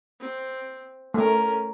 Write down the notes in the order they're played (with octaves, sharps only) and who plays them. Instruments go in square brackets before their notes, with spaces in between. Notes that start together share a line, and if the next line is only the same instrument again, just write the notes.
[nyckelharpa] C4
[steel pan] A3 [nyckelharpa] C#4 A#4